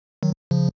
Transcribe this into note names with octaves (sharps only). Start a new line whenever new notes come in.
D#3 F#3
C#3 F3